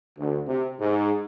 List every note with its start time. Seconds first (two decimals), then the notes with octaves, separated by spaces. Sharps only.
0.18 D2
0.48 C3
0.79 G#2